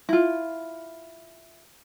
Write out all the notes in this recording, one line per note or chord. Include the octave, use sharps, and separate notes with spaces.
E4 F4